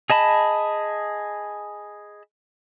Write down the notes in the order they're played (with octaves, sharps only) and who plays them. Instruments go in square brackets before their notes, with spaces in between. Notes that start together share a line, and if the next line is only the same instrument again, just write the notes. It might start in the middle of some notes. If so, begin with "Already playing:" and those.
[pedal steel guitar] G#4 D#5 A5 B5